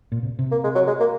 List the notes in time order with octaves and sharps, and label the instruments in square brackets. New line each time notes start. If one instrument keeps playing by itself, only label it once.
[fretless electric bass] A#2
C3
C3
[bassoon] A#3
G#3
F#3
G#3
A#3